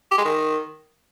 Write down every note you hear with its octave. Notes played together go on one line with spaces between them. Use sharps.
G4
G#3
D#3